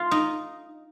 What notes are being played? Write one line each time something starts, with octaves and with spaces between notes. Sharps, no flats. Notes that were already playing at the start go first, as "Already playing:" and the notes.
Already playing: F4
D#4